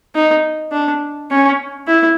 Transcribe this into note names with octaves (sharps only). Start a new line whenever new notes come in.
D#4
D4
C#4
E4